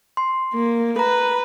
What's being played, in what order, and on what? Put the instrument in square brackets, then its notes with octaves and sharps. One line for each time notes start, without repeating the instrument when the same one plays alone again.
[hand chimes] C6
[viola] A#3
[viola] B4 [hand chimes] A#5